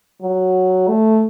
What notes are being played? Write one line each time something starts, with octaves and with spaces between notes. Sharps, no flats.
F#3
A3